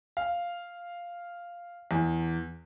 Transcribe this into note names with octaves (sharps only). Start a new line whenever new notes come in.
F5
E2